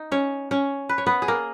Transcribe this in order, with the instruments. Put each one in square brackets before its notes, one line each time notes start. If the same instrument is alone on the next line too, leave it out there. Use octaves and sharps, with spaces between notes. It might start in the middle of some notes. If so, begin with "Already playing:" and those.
Already playing: [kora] D#4
C#4 C#5
C#4 C#5
B4
C#5
B3 B4
G#4
A#3 A#4